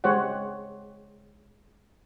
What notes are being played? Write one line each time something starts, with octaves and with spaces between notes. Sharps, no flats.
G#3 G4 C5 C#5 F#5